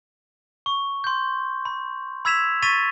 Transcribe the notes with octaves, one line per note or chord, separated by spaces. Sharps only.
C#6
C6 G6
B5
B5 E6 G#6 B6 E7 F7
C#6 A6 B6 D#7 F7